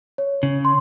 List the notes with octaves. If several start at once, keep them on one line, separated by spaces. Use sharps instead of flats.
C#5
C#3
C6